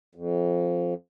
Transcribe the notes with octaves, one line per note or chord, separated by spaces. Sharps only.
F2